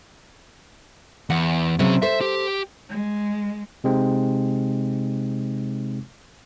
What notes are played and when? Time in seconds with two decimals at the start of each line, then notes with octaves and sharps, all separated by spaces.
1.30 E2 F#5
1.79 C3 F#3 C#4 G#4
2.02 A4 C5 E5
2.21 G4
2.89 G#3
3.84 C3 G#3 C4 D#4